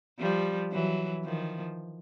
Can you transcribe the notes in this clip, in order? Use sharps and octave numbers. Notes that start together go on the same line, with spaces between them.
F3 G3
E3 F#3
D#3 F3